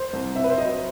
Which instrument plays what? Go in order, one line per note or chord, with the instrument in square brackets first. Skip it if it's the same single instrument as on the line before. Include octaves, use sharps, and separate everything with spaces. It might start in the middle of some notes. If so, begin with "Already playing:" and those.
Already playing: [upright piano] C5
C2
C4 E5
B4
C5
F#3 D#5